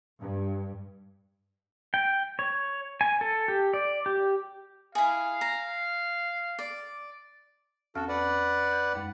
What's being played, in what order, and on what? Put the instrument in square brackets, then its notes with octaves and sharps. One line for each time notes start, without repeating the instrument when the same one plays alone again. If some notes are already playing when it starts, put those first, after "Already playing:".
[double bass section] G2
[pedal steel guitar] G5
C#5
G#5
A4
G4
D5
G4
[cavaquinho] E4 G#4 [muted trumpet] F5
[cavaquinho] A#5
D5
[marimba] E2 C4 F6 [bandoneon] F#4 A4
[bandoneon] B4 D5 F#5
[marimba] G6
F#2 G#3